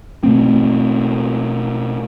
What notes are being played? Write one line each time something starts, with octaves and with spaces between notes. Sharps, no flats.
B2 A3 C4